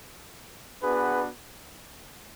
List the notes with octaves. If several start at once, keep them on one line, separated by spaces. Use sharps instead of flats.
B3 D4 F#4 G#4 B4